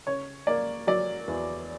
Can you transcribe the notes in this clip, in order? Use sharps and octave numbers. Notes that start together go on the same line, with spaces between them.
C#3 C#5
A#3 D5
F#3 D5
E2